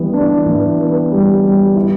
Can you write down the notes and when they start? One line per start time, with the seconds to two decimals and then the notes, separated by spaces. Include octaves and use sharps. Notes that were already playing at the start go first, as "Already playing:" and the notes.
Already playing: E3 G3 B3
0.13 D4
0.46 E3
0.79 B3
1.12 G3
1.44 G3
1.76 E4